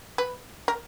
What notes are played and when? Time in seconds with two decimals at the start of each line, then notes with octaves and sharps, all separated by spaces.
0.18 B4
0.68 A#4